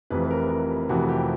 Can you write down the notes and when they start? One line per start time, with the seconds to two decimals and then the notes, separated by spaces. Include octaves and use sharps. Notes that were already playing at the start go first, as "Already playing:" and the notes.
0.11 F1 F2 C3 E3 B4
0.24 B4
0.31 A#4
0.50 A#4
0.89 F1 F2 C3 E3 F#4
1.09 G4